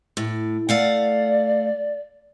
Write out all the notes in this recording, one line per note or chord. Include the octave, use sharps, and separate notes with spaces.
A2
A3 D5 F5 F#5